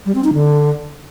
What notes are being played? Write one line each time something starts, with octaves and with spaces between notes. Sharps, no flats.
G3
C4
D#4
D3